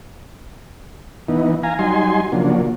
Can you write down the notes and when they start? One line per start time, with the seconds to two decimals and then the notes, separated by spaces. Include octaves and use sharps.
1.29 E3 B3 D#4
1.63 F5 G#5 A#5
1.79 F#3 G3 D#4 G#5 C6
2.32 C#3 F3 F#3 A#3 D4